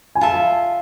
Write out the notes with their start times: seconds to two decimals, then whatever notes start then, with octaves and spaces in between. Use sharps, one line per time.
0.15 G#5
0.21 F4 A4 E5 A5